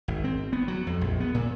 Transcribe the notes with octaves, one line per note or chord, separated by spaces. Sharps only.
G#1
C4
B3
F#3
F2
A#1
B3
A#2